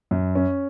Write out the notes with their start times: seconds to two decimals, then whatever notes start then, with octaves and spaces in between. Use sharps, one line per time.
0.11 F#2
0.35 C#4